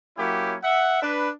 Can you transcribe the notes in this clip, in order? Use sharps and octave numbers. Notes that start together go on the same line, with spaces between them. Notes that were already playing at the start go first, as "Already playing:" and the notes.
F#3 A#3 C#4 E4 G4
E5 F#5
D4 B4